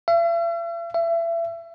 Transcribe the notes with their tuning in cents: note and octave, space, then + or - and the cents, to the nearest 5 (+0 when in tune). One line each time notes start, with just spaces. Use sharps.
E5 +45
E5 +30